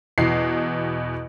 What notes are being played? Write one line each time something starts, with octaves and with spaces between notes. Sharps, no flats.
E2 B2 C7